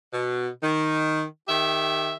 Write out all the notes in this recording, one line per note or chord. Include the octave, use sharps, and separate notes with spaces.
B2
D#3
D#3 G4 E5